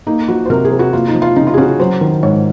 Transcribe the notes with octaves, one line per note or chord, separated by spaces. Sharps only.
A#3 D#4
F3 F#4
C5
C3 A#4
G#4
C3
F#4
A#3 F4
D#4
F3
F4
C#3 D#4
F4
G#4
C#4 F#4
F#3 C5
D#3
G#2 C#5